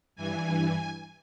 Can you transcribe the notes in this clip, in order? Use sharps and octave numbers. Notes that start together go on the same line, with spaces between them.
G2 E3 G#5